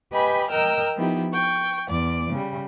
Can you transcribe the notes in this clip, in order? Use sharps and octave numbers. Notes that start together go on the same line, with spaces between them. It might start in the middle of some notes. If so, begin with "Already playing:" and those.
G4 B4 D#5 G5 G#5 B5
A#4 D#5 G5 A#5 E6 F6
F3 B3 D#4 E4 G4
G5 C#6
E2 D5 D6
C#3 G3